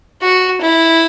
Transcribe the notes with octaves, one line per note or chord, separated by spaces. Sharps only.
F#4
E4